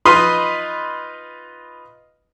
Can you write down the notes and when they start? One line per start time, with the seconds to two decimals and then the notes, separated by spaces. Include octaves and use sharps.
0.05 D#4 F4 B4 D#5 B5 C6